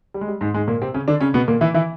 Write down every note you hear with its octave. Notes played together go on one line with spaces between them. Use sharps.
G3
G#3
G3
G#2 G#3
G#2 G#3
A#2 A#3
C3 C4
C#3 C#4
D3 D4
C#3 C#4
B2 B3
A#2 A#3
E3 E4
E3 E4